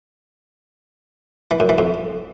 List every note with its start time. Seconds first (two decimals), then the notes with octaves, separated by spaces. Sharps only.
1.51 E3
1.60 F#2
1.69 E3
1.78 F2